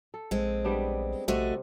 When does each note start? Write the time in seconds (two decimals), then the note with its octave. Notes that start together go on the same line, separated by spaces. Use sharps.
0.14 A4
0.31 A#1 G#3 C4
0.65 G3 B3 D4
1.28 A#1 C3 A3 F#4 D#5